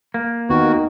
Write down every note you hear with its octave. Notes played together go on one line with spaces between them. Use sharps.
A#3
D#2 D#3 B3 F#4